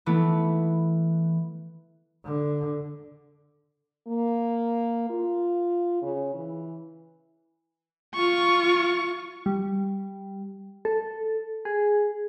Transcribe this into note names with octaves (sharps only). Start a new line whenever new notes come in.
E3 A3 B3 E4
D3
A#3
F4
C#3
E3
F4 C#6
G3
A4
G#4